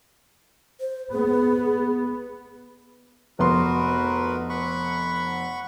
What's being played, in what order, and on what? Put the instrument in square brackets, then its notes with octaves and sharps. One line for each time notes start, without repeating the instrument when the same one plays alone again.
[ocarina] C5
[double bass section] B3 [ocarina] G#4
[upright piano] F1 B3 C6 [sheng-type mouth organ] F#4 A#4 B4
[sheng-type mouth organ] F#5 B5 C#6